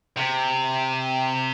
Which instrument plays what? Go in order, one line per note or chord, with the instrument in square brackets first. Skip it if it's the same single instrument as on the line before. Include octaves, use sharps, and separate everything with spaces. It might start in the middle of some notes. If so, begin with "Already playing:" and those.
[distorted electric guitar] C3